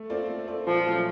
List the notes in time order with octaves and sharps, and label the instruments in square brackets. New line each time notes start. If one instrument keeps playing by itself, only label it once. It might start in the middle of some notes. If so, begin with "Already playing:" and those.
Already playing: [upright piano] A3
C4 F4 A4 D5
A3
C4 F4 A4 D5
[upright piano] A#2 [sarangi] F3
[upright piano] F#3 A3 C#4